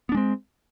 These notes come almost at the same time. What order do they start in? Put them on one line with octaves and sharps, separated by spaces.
B3 D4 G#3 C4